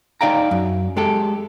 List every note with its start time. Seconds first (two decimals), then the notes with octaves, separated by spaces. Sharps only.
0.21 D#4 D5 F5 G5 A#5
0.51 F#2
0.97 G#3 G4 A4